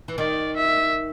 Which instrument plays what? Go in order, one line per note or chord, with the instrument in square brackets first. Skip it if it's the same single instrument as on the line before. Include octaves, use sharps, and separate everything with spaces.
[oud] E3
[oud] D#3 [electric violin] D5
[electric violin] E5